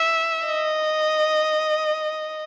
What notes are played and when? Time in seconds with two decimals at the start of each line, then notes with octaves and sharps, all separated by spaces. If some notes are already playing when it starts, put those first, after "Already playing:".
Already playing: E5
0.47 D#5